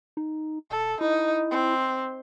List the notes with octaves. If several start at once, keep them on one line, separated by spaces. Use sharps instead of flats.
D#4
E1 A4
D#4 E4
C4